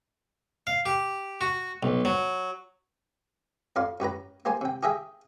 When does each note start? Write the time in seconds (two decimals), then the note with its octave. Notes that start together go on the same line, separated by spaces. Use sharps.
0.67 F5
0.86 G4
1.41 F#4
1.83 B1
2.05 F#3
3.76 F2 D5 F5 C6
4.00 F#2 G4 B4 A#5
4.45 A#3 G4 C5 G#5
4.61 C3 G5
4.83 G4 G#4 D#5 E5 G5